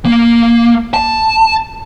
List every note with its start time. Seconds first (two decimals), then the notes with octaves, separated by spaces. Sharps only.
0.05 A#3
0.94 A5